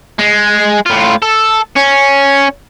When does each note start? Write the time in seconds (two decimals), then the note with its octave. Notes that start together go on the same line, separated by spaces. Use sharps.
0.19 G#3
0.86 A2 F4
1.22 A4
1.76 C#4